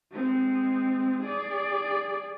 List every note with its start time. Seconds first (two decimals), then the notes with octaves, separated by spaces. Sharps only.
0.12 G#3 C4
1.23 G#4 D5